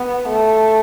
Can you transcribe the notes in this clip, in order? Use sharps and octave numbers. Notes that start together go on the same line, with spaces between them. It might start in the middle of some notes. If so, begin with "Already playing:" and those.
Already playing: B3
A3